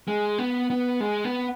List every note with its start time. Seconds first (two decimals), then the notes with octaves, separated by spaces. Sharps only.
0.08 G#3
0.38 B3
0.70 B3
1.00 G#3
1.24 B3